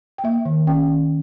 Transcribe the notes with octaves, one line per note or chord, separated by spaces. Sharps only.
G5
A#3 E5
D#3
C#4 G5
D#3